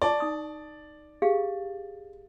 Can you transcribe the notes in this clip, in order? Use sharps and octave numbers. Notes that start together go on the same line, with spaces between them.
D5 A5 C#6
D#4 D#6
G4 G#4 F5